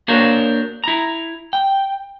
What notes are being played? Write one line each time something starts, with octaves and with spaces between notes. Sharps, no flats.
A#3 D4 F#4 A#4 C5 C#5
E4 A#5
G5